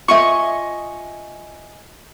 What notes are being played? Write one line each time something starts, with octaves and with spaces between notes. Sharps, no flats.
F4 D#5 E5 G#5 C#6